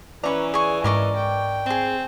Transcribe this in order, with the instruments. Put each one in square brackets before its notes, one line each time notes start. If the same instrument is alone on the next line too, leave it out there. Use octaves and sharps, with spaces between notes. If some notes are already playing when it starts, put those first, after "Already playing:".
[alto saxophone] E3 [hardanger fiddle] C#4 B4 [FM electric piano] D5 [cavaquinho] A#5 C#6
[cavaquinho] G#4 C#6 [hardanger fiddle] G#5
[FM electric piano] G#2 [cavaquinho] A#4 D5 C#6 [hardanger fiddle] D#5
[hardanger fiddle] G5
[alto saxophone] C4 [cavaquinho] G#4 C6